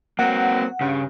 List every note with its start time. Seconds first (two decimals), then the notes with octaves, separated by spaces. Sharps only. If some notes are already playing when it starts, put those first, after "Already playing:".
0.19 F#3 A#3 C4 F#5
0.81 G2 C#3